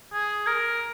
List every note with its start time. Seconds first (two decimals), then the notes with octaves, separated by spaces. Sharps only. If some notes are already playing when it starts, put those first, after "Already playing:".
0.13 G#4
0.47 A#4